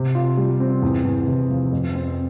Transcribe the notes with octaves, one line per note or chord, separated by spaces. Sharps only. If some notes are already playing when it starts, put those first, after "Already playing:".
Already playing: C3
F4
G3
C4
E2
E2
C3
F3
F2
C4